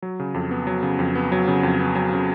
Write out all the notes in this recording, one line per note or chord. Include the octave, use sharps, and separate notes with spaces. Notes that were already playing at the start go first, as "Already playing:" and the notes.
F#3
C#3
F2
B3
F#3
C#3
F2
B3
F#3
C#3
F2
B3
F#3
C#3